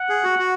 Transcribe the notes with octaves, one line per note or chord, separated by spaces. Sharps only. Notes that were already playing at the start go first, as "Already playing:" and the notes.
Already playing: F#5
G#4
F#4
F#4